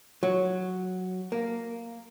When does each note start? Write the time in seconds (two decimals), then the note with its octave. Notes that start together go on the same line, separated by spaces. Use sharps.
0.23 F#3
1.32 A#3